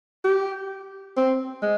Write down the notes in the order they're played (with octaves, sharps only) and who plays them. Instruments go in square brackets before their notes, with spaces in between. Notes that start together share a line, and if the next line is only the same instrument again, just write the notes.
[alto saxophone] G4
C4
G#3